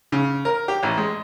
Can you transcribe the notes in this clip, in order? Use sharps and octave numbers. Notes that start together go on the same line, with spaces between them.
C#3
A#4
G4
A1
G#3